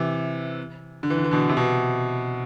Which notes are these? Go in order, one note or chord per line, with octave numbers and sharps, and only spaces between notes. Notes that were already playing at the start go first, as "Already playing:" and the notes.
Already playing: C3 E3
D3
E3
D3
E3
B2 D3
C3
B2